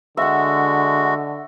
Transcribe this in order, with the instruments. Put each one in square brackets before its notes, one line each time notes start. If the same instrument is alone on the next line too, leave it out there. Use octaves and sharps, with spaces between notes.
[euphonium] D3 [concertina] G#3 F#4 [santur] E5 F#5